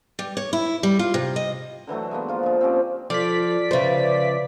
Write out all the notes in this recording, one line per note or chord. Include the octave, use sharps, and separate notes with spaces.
G3
C#5
E4
G3
F4
C3
D#5
D3 E3 F#3 A3
G#3 A#3 B3
F3 F4
D3 G#3
C4 C#4 G4
F3 F4 A4 D5 B6
C#3 F3 B4 C5 E5 F5